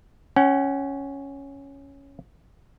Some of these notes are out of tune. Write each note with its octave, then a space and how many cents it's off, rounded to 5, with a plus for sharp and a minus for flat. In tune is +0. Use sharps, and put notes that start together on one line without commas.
C#4 +0 F#5 +45